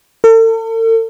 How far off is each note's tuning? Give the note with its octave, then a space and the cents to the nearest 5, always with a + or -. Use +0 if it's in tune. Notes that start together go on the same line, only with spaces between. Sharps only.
A4 +45